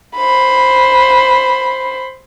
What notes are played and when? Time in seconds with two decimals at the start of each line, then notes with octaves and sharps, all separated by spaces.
0.16 C5 B5